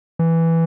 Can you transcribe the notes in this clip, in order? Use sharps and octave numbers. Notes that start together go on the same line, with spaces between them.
E3